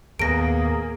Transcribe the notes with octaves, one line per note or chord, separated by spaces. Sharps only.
D#2 A2 A#3 B3 G#4 A#6 D7